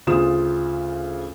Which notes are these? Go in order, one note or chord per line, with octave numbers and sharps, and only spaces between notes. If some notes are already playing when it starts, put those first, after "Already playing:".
D2 C#3 F4 D#6 E7